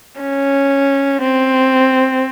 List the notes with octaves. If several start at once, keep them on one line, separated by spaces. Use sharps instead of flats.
C#4
C4